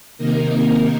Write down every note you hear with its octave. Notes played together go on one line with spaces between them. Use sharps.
C3 D#3 A#3 D#4 A#4